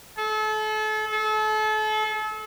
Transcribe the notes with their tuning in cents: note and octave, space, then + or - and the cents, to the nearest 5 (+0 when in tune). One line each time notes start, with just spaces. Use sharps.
A4 -35
A4 -35